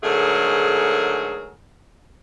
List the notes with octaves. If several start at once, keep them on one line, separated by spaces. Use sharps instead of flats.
G#2 D3 F#3 A3 G#4 A#4